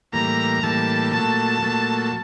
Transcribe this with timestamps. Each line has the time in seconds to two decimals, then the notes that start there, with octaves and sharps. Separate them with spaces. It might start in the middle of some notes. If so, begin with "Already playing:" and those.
0.13 A2 E3 G3 A#3 A#5
0.63 A2 E3 G3 A#3 A5
1.12 A#2 F#3 A3 A5
1.62 A#2 F#3 A3